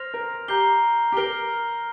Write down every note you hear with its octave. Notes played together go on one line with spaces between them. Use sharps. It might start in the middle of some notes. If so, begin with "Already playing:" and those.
Already playing: C5 F6 A#6 F7
A#4
G4 A#5 G6 C7 G7
G4
A#4 F6 C7 G7